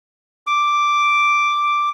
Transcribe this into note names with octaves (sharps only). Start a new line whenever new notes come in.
D6